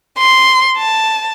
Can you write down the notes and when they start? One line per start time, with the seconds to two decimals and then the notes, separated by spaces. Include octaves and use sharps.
0.18 C6
0.78 A5